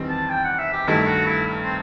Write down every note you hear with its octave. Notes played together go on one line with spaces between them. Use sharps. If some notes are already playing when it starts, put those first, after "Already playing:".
Already playing: E2 D#3 G3 C4
A5
G5
F#5
E5
G4
G2 D#3 A3 E4
E4
F#4
E4
C4